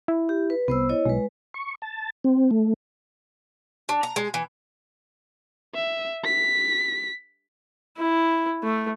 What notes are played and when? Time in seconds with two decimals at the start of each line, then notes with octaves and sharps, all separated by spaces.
0.08 E4
0.29 G4
0.50 B4
0.68 C2 B3 C5 E6
0.89 E4 C#5 D#5
1.06 B1 G#3 B4
1.54 C#6
1.82 A5
2.24 C4
2.51 A3
3.89 D4
4.03 A#5
4.16 G#3
4.34 E3
5.75 E5
6.25 B6
7.97 E4
8.63 A3